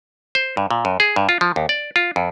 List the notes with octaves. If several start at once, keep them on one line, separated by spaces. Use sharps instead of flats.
C5
G2
A#2
F#2
G#4
G2
F4
F3
D#2
D5
F4
F2